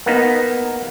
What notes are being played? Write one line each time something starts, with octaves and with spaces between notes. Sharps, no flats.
A#3 B3 D#4